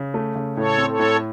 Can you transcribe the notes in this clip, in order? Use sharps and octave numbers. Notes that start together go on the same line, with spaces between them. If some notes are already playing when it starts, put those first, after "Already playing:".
Already playing: C#3
A3
C#3
A2 A4 C#5
C4
A4 C#5
A2